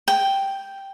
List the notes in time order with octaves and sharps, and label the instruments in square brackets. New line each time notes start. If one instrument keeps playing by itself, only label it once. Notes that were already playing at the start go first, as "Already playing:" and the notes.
[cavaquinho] G5